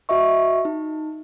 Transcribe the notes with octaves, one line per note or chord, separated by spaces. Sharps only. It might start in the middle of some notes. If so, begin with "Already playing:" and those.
F#4 D#5 E5 C#6
D#4